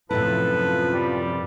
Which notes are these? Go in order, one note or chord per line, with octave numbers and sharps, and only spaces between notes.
F#2 A2 C3 F3 E4 A4 B4
G3